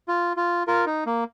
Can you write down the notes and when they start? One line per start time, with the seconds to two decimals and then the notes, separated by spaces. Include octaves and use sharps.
0.08 F4
0.37 F4
0.67 F4 A#4
0.86 D#4
1.06 A#3